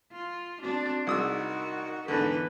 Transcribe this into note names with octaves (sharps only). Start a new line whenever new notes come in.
F4
C4 D4 F#4
C2 D#4 F#4 G#4 D#6 E6
A#4
E2 G#2 D3 B4